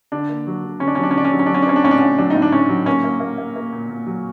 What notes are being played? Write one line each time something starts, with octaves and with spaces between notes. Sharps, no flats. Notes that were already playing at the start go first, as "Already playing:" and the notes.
D3 D4
A#3
F#3
D3
D3 C#4
D4
C#4
F#3
D4
C#4
D3 D4
C#4
F#3 D4
C#4
D4
F#3
C#4
D4
C4 C#4
D4
A2 C#4
D4
A2 C#4
F#3 D4
A2 D#4
D4
A3 C#4
F#3
A#3 C#4
A#3
A#3
A#3
A#3
A#2
A#2
F#3